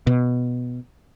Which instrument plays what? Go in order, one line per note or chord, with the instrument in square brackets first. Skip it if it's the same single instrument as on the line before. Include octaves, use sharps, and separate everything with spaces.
[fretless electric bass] B2